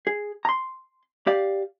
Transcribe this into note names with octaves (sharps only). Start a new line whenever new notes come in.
G#4
A#5 C6
G4 D5 F5